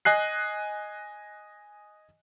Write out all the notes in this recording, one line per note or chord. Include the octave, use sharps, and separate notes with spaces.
D#5 G#5 F#6 C7